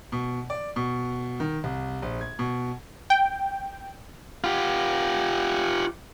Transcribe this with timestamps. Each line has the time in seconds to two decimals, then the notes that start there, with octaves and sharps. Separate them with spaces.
0.12 B2
0.50 D5
0.76 B2
1.40 D#3
1.64 C2
2.02 A#1
2.21 G#6
2.39 B2
3.10 G5
4.44 F4 G4